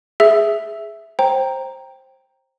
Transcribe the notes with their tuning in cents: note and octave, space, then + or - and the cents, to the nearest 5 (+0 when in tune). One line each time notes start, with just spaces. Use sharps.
G#4 +0 E5 +0 E6 +0
C5 +15 G5 +0 A#5 +0